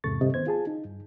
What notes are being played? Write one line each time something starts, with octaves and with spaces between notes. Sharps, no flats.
E2 G#2 C3 A4 C#6 A6
G2 C3 D#5
D#3 B3 C5 G#6
F4 G#4 A5
D#4
G2